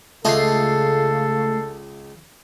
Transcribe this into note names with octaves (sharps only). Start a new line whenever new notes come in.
C#2 C#3 A3 F4 A4 D#5 C7